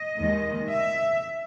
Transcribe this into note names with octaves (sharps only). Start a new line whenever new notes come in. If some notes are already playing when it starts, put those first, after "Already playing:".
Already playing: D#5
D#2 D#3 G#3
E5